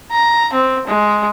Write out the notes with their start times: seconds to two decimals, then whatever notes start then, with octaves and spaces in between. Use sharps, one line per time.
0.11 A#5
0.53 C4
0.87 G#3